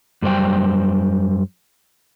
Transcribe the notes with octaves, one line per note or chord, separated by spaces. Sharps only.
F#2 G3 C5 G5